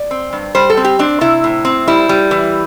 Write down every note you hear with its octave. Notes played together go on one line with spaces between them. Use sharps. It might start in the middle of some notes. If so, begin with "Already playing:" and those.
Already playing: D5
C4
G2
G3 C5
A4
C4
G4
C4 D4
C3 E4
A2
C4
G3 E4
G3
E3